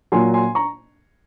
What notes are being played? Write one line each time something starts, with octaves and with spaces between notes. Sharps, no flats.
A#2 F#3 G#5 C6
G#5 C6
A#5 C#6